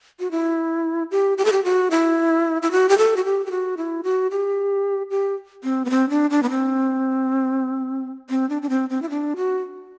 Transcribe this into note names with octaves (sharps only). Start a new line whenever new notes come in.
F#4
E4
G4
G4
A4
G4
F#4
E4
E4
F#4
G4
A4
F#4
G4
G4
F#4
E4
F#4
G4
G4
C4
B3
C4
D4
D4
B3
C4
C4
D4
D4
C4
C4
E4
D4
F#4